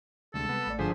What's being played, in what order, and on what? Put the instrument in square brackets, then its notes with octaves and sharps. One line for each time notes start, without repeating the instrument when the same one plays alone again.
[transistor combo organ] D2 [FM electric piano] C3 G3 G#3 [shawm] A4
[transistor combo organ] B3
[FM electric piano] A1 A3 D5
[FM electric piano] G1 G#2 B6 [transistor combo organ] D3 F3 G#4 [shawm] C5